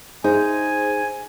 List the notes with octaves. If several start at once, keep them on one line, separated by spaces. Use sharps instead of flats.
D#4 G#4 C5 G#5